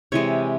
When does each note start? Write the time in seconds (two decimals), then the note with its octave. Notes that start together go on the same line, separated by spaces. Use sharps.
0.12 C3 E3 G#3 C#5